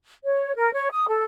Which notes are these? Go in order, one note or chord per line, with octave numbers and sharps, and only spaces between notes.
C#5
A#4
C#5
D#6
A4